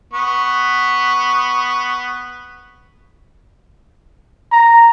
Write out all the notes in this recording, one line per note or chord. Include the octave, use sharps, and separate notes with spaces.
B3 C#6
A#5